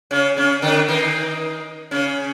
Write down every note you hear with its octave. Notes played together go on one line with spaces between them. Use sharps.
C#3 C#4
C#3 C#4
D3 D4
D#3 D#4
C#3 C#4